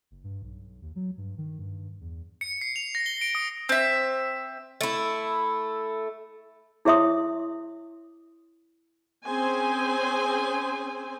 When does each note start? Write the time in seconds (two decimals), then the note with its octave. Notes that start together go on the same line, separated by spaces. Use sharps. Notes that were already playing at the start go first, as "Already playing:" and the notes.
0.11 F#1
0.24 G2
0.42 B1
0.82 D#2
0.96 F#3
1.17 G2
1.38 D#3
1.59 G2
2.01 E2
2.41 C#7
2.61 C7
2.76 F7
2.95 A#6
3.06 G7
3.21 D7
3.35 D#6
3.69 C4 E5
4.81 A3 E4
6.85 E4 G#4 C#5 E5 C6 D#6
9.26 C4 C#4 G#4 C5 G#5